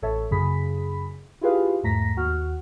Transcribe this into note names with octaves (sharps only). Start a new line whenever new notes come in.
A1 A4 C#5 E5
F#2 C#3 G#4 B5 B6
E4 F4 G4 G#4 B4 F5
E2 G#2 A3 A#5 A#6 B6
D#2 F#4 F#5 F6